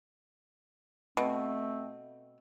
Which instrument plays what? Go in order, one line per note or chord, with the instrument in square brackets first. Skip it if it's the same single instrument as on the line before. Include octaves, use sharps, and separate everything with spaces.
[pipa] B2 [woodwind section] A3 C4